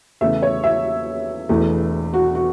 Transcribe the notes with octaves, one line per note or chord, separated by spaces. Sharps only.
E2 C#3 A3 E5
C#5
E5
E1 E2 E3 A3
F#4
F#4